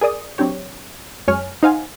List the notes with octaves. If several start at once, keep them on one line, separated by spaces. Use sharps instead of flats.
G#4 A#4 D5 D#6
F#3 C4 D4 G4 C#5
F#2 G#3 C#5 G#5 F6
D#4 C5 F5 F#5 G#5